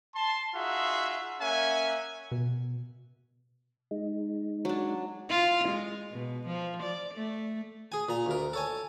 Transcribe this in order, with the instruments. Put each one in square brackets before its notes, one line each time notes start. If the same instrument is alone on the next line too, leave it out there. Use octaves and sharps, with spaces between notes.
[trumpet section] A5 C6
D#4 F4 F#4 G#4 E5
A#3 C#4 E5 F#5 G#5
[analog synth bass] B2
[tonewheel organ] G#3 D#4
[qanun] F#3 D4
[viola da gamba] F4
G#3
B2
F3
D5
A3
[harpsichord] G#4 G#5
A#2 A#5
D2 A#4
A4 C#5 G#5